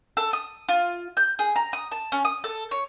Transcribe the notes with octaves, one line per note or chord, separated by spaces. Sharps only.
A4
D#6
F4
G6
G#4
A#5
D#6
A5
C#4
D#6
A4
C#5